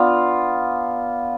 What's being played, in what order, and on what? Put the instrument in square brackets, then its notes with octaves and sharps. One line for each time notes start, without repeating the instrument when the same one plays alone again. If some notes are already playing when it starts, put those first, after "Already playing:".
Already playing: [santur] B3 D4 F4